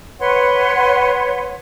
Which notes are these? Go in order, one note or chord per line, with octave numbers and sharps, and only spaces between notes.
B4 C#5 F#5 C6